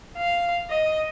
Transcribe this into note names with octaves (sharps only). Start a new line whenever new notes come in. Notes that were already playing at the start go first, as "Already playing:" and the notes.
F5
D#5